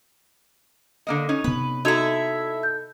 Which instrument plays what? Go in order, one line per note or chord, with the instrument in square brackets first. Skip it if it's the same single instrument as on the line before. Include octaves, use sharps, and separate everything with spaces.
[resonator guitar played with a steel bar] D3 A#3 D#5
C#4 D#4
[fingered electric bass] C3 B3 [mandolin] B4
[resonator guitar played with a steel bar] D#4 A4 [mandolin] E4 E5 [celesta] F#4 G#6 F7
[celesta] G6